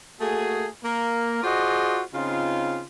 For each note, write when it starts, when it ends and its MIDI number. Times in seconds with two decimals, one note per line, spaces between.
0.20 0.66 57
0.20 0.66 58
0.20 0.66 66
0.20 0.66 68
0.83 1.41 58
0.83 1.41 70
1.42 2.01 65
1.42 2.01 66
1.42 2.01 68
1.42 2.01 72
1.42 2.01 74
1.42 2.01 75
2.14 2.82 49
2.14 2.82 60
2.14 2.82 63
2.14 2.82 65